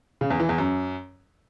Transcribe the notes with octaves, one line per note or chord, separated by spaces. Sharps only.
C#3
E2
E3
E2
F#2